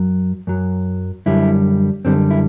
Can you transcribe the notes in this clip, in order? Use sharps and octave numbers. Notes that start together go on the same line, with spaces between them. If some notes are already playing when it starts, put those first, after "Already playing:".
Already playing: F#2 F#3
F#2 F#3
F#2 D3 G3 E4
F#2 D3 G3 C4
E4